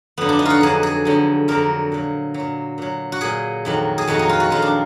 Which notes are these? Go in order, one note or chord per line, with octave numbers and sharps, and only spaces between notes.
F2 D3 F#3 B3
D4
D#4
F4 F#4
F2 D3 F#3 G#4
G#4
F2 D3 F#3
F2 D3 F#3 A#4
A#2 F#3
F#3
A#2
A#2 F#3
F#4
A#2 F#3 G#4
F2 D#3 F#3
G#4
F2 D#3 F#3 F#4
D#4
F4
F#4
F2 D#3 F#3 F4
D4